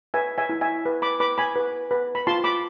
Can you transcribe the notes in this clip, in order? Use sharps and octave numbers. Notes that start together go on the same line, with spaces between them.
B4 E5 G#5
E5 G#5
E4
E5 G#5
B4
B5 D6
B4 B5 D6
G#5 B5
B4
B4
B5
F4 A5 C6
B5 D6